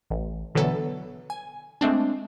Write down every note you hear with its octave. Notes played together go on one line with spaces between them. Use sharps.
A1
B2 D3 E3 F#3 B3 A4
G#5
G#3 A3 C4 D4